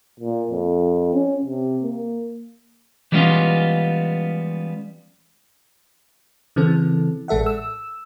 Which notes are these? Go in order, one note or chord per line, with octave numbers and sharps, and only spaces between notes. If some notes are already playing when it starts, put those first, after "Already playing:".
A#2
F2
C#4
C3
A#3
E3 G3 G#3 B3 C#4 F4
C#3 E3 C4 A4
A1 G#3 A4 E5 F#5
E6